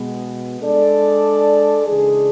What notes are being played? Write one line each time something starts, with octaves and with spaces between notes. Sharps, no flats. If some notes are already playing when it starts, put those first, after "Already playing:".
Already playing: B2 G#3 B3
G#3 D4 A4 D5
C#3 E3 G#3 D4 G#4